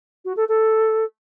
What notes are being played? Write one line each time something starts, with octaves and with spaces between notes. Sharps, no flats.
F#4
A4
A4